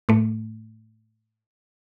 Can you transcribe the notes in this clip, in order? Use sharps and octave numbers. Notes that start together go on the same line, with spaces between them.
A2 A3